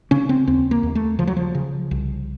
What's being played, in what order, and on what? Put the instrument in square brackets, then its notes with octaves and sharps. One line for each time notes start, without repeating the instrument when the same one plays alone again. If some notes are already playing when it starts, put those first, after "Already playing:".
[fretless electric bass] C#3 C#4
C4
D#2 C4
A#3
D#2
A3
C#3 F3
F#3
F3
C#3
C2